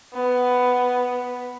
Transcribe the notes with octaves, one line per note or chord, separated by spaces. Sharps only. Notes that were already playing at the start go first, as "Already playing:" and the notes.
B3